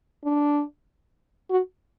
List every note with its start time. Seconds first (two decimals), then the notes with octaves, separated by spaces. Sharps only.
0.25 D4
1.50 F#4